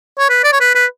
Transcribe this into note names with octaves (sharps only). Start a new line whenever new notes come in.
C#5
B4
D5
C#5
B4
B4